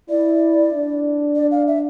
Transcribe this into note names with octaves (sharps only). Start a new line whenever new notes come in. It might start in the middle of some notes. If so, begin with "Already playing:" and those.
E4 D5
D4
D5
F5
E5